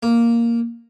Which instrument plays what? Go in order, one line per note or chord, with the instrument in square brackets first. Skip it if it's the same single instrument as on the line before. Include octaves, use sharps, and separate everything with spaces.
[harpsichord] A#3